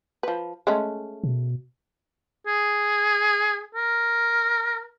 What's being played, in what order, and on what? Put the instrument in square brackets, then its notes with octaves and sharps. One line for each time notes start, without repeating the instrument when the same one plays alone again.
[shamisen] F3 B4
G#3 A3 C#4
[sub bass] B2
[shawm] G#4
A#4